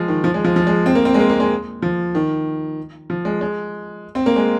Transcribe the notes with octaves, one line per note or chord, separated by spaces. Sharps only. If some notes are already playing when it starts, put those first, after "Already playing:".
Already playing: F3 G#3
D#3
F3
G#3
F3
F3
G#3
C4
A#3
C4
G#3
A#3
A#3
G#3
F3
D#3
F3
G#3
G#3
C4
A#3
G#3